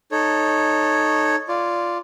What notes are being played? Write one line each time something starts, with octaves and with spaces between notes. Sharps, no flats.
D#4 A4 C#5
F4 D5